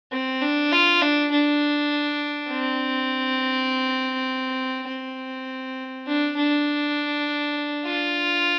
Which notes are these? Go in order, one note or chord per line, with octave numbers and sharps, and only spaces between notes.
C4
D4
F4
D4
D4
C4
C4
D4
D4
F4